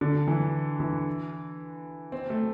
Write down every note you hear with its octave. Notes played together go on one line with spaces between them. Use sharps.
D3
E3
E3
C4
A3